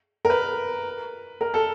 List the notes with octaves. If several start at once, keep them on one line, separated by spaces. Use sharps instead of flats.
A#4
B4
A#4
A4